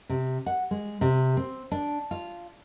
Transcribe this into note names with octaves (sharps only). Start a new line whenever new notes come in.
C3
F#5
G#3
C3
C4
D4
F4